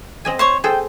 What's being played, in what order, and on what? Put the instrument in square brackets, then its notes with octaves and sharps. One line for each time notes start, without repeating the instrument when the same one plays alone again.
[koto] C4 D#5 G#5
[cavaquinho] C5 C#5 C#6
[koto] G#4 A4 C5 [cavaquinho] G5